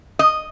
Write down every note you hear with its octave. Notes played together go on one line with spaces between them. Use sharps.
D#5